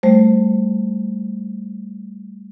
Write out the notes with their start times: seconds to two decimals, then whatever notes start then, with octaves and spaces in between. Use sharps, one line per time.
0.03 G3 A3 C5